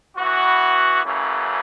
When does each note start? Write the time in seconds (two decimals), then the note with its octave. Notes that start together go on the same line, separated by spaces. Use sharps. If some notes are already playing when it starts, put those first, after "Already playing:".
0.17 E3 B3 F#4
1.04 F#2 C#3 E3 A3